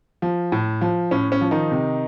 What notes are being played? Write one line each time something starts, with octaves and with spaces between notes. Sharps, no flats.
F3
A2
F3
A2 C#4
C#4
F3
D#3 D#4
C3